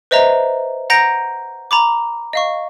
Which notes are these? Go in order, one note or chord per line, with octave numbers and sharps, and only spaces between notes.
B4 C5 D#5 E5 A#5
F#5 A#5 G6 A#6 D7
A#5 B5 D6
D#5 F5 C#6